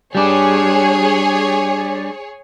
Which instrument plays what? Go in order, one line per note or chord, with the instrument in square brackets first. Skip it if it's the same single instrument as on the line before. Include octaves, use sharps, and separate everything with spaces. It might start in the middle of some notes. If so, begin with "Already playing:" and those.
[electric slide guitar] G3 D4 [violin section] G#4 C#5